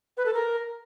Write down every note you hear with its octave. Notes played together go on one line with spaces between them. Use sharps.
B4
A4
A#4